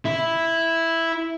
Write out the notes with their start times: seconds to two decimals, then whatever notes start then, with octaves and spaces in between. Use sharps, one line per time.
0.06 E4